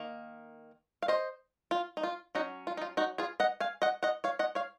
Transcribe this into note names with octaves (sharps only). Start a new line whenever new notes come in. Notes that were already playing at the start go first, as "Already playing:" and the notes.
Already playing: D#3 A#3
F5
C5 D#5
F4
D#4
F4
F#3 C#4 D#4 F#4
F4
D#4
F4
D#4 F#4
F4 G#4
D#5 F#5
F5 G#5
D#5 F#5
D#5 F#5
C#5 F5
D#5 F#5
C#5 F5